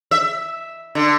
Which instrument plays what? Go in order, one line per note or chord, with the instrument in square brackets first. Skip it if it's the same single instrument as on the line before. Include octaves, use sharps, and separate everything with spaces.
[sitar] E5
D3